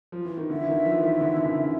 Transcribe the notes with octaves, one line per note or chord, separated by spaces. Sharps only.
F3
E3
D#3
D3 E5
E3
D#3
E3
F3
E3
D#3
D3
D3
C#3